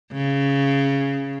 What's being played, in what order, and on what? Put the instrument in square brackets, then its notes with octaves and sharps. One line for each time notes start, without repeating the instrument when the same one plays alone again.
[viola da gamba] C#3